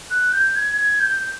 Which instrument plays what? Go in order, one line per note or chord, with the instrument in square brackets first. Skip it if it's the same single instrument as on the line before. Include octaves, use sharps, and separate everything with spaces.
[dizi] F#6
G6
G#6
G#6
G6